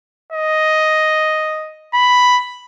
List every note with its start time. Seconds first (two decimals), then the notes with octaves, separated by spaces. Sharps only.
0.33 D#5
1.94 B5